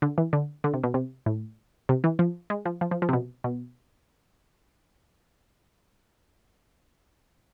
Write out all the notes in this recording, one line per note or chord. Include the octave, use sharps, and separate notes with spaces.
D3
E3
D3
D3
C3
B2
C3
A2
C3
E3
F3
G#3
F3
F3
F3
F3
C3
B2
B2